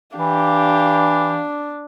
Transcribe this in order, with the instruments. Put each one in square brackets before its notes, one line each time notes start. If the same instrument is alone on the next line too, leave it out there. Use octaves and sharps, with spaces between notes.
[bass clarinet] E3 [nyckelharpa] D4 [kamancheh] G4 F5